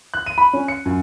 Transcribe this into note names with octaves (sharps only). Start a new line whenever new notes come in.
F#6
D#7
B5
C#4
C#7
F#2